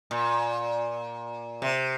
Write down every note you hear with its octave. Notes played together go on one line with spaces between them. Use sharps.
A#2
C3